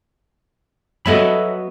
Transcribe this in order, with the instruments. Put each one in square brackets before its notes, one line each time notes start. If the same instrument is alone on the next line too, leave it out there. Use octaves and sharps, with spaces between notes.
[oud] F#3 B3 A4 [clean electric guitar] D#5 E5 B5